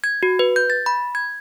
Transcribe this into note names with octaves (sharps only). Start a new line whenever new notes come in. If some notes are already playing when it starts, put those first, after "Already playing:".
G#6
F#4
B4
G6
A6
B5
G#6